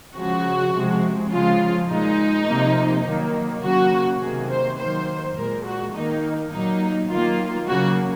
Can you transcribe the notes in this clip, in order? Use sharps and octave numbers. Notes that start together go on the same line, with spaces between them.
C#3 F3 G#3 F#4
C3 F3 G#3
C#3 F3 G#3 F4
A#2 G#3 D#4
C3 F3 A#3
D#3 F#3 A#3
C#3 F#3 A#3 F#4
C3 D#3 A#3 G#4
C5
D#3 F#3 A#3 C5
A#2 G#3 A#4
F#4
D#3 A#3 D#4
A#2 F#3 A#3 D#4
D#3 F#3 A#3 F4
C#3 F#3 A#3 F#4